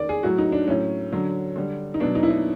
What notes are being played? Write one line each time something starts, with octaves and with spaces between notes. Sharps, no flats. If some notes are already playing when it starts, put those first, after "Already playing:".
Already playing: D#3 D5
G#4
A2 F#3 F#4
D#4
D4
A2 F#3 C#4
D3 F#3
D3 G3
D#4
B2 F#3 D4
D#4
E4
D#4